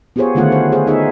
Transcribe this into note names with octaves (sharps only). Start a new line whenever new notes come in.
B3 F4 G4 G#4 C5 C#5
D3 D#3 A3 B3 F4 F#5
C5
G#4 C5
B3 D#4 G#4 E5